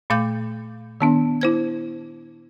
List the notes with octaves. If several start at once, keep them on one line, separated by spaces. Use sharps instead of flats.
A#2 A3 F5 D6 G6
D#3 B3 D4
E4 C5 G#6